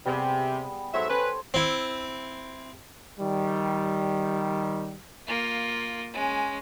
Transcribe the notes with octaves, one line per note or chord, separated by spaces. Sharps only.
C3 G3 B3 G#4
G#2 F#3 A4 C5 C#5 E5
C#4 B4
C4 E4
D#3 G3
A#3 F4
G#3 C#4